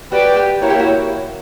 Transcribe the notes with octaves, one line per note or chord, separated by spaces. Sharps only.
F#4 G4 B4 D5 G5
G4
A#3 E4 F#4 A#4 C#5
G4
F#4